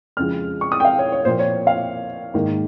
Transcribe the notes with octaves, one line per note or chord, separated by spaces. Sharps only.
F2 C#3 F3 G#3 F6
C#6
D#6
G5
F5
C#5
C#5
A#2 F3 A#3 C5
C#5
F5
G#2 D#3 A#3